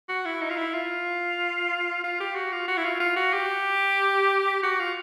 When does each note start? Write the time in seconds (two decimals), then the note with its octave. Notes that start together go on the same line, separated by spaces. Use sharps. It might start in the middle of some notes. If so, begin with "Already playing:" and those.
0.09 F#4
0.25 E4
0.41 D#4
0.50 F4
0.57 E4
0.74 F4
2.04 F4
2.20 G4
2.35 F#4
2.52 F4
2.68 F#4
2.77 E4
2.85 F4
3.00 F4
3.16 F#4
3.33 G4
4.63 F#4
4.79 F4